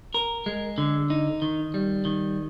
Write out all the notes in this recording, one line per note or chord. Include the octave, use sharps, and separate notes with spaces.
A#4
G#3
D3
D#4
D#3
G3
D#3